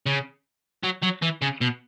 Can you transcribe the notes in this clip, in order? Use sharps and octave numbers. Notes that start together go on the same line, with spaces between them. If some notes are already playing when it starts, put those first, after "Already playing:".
C#3
F#3
F#3
E3
C#3
B2